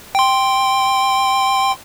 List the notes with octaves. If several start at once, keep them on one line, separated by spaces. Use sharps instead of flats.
G5 C6